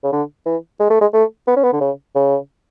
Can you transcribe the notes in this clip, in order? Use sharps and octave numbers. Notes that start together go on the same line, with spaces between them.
C#3
D3
E3
G#3
A3
G#3
A3
B3
C#4
B3
D3
C#3
C#3